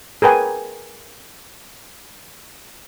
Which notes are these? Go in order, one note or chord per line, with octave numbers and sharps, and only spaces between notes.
G#4 A#4 B4 G5 G#5